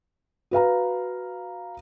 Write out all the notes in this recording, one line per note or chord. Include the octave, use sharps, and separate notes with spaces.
F#4 B4 F5 A#5